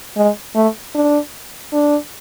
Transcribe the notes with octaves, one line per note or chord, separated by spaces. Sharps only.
G#3
A3
D4
D4